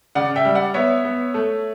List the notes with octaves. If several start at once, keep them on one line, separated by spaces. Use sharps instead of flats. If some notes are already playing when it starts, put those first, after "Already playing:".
C#3 D5 F#5
E5 G5
G3
D5 F#5
B3 C#5 E5
B3
A3